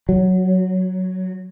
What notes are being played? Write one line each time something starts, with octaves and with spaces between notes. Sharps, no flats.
F#3